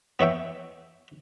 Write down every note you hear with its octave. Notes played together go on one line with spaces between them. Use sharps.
B3 C#5 E5 G5